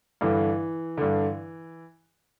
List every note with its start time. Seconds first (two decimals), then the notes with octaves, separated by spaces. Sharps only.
0.21 G2 D3 E3
0.97 G2 D3